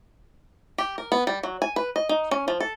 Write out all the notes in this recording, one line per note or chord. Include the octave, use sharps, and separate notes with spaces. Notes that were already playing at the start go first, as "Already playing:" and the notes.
G4
A#4
B3
G3
F#3
G#5
B4
D#5
D#4
C#4
F3
A4